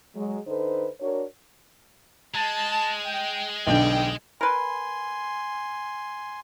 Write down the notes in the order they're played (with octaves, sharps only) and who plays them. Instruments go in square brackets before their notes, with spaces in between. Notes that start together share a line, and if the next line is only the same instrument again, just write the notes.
[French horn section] F#3 G#3
D3 D#4 A4 B4 C5
D4 F#4 A#4 C#5
[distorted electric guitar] G#3 [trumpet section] A5
[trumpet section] G5
[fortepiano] B1 D3 [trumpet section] G3 C4 G5
[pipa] A#4 B4 [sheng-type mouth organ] G#5 C6